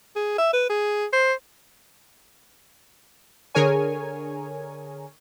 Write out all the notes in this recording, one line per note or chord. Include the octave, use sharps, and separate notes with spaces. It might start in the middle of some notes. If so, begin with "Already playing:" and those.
G#4
E5
B4
G#4
C5
D3 G#4 A#4 C#5 G#5